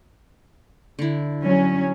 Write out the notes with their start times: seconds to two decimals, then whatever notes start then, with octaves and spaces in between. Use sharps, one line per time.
0.99 D3 E4
1.43 F#3 C#4